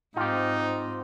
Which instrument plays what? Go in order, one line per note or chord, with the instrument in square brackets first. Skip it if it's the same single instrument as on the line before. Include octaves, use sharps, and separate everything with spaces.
[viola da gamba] G#2 C4 [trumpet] D#4 [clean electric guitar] F4 G4